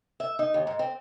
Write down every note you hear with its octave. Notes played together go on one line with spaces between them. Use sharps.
E5
D#4
D#2
G#2
C4